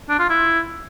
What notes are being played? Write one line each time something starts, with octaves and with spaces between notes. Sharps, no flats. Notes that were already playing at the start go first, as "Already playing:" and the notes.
D4
F4
E4